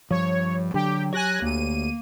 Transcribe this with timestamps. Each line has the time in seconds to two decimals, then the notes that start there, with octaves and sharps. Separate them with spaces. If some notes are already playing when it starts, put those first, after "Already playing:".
0.11 G2 F3 C#5
0.74 D3 F#3 G4 G5
1.13 G4 C#5 G#5 F#6 A#6
1.42 D2 A#3 D#7